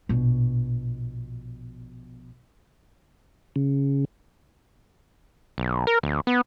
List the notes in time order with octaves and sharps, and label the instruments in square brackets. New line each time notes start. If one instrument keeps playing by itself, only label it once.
[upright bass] A#1 B2
[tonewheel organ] C#3
[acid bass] B1
A#4
D2
B3